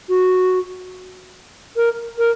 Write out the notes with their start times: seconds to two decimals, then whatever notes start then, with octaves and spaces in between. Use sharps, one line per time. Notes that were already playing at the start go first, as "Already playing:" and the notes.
0.09 F#4
1.77 A#4
2.18 A#4